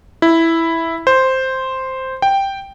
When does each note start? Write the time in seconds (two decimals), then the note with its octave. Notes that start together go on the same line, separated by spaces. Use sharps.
0.22 E4
1.07 C5
2.22 G5